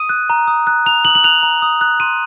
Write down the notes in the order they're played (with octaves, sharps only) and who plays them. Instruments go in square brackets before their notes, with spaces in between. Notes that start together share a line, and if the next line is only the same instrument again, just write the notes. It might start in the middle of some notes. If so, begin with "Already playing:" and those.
Already playing: [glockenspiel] D#6 D#7
F#6
A#5
D#6
F#6
A#5 F7
D#6 F#7
F#7
F#6 F7
A#5
D#6
F#6
C6 D#7